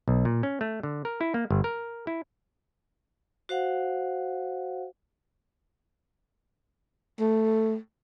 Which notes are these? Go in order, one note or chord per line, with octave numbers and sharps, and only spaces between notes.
B1
A#2
C#4
A3
D3
A#4
E4
A#3
G1
A#4
E4
F#4 C5 F5 F#5
A3